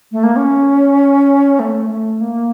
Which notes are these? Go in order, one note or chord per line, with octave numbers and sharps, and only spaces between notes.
A3
A#3
C#4
A3
A3
A#3